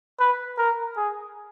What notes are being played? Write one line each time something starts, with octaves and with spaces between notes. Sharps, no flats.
B4
A#4
G#4